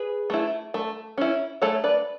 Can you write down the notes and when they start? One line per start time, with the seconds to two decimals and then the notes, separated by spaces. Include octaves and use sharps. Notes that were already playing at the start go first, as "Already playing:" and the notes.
Already playing: G#4 B4
0.30 A3 E4
0.74 A3
1.18 C#4 E4
1.62 A3 A4 C#5
1.84 B4 D5